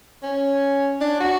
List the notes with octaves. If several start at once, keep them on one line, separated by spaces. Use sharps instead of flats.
C#4
D4
F#4